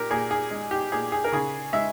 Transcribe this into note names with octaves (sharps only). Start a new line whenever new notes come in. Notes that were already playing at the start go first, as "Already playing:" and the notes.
Already playing: A#2 G4 A#4
A#2 G#4
G#4
G#3
G4
A#2 G#4
G#4
A#4
C#3 G#4
G#3 E5